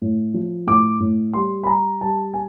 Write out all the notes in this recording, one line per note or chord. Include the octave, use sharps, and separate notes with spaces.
A2
F3
A2 D6
A2
G3 C6
B5
G3 A#5
G3 A5
G#5